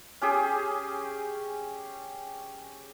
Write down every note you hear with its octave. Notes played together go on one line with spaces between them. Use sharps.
C#4 G4 G#4